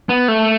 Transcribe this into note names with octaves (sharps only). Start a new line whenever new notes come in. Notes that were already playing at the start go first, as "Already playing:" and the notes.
B3
A3